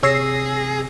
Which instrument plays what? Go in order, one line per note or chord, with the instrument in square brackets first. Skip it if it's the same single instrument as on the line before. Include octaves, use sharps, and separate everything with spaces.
[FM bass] C3 [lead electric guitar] G#4 [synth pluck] C#5 [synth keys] E6 A#6 C7